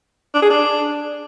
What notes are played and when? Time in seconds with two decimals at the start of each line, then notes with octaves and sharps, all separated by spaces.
0.34 D4
0.42 G#4
0.50 D4